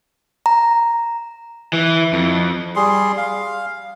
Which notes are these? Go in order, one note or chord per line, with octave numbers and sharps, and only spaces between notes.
A#5
E3
F2
G3 G#4 C6
F5